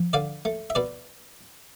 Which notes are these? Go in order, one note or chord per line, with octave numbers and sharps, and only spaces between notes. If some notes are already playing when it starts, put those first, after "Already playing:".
Already playing: F3
D3 D5 F5
A3
E5
B2 B4 D5